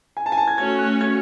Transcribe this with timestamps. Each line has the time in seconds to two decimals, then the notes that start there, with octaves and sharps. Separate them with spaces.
0.17 G#5
0.26 A5
0.32 G#5
0.38 A5
0.48 G#6
0.58 A3 C#4 F#4 C#5 G#6
0.79 F#6
1.01 G#6